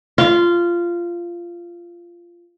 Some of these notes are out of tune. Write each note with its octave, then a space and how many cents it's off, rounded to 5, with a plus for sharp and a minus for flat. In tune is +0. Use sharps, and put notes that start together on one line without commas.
F4 -15